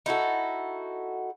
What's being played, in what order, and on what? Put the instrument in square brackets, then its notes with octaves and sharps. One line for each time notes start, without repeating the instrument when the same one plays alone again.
[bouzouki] D#4 E4 F#4 A4